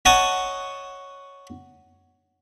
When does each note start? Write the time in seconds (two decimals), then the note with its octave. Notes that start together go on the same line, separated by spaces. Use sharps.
0.05 C#5 D#5 F#5 A5 C#6 D#6